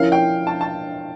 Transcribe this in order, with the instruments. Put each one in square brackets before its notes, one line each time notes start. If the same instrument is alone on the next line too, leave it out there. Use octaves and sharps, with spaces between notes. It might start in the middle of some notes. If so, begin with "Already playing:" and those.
Already playing: [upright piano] F3 C#4 E4 A#4 [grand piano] F5
[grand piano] G5
A5
A5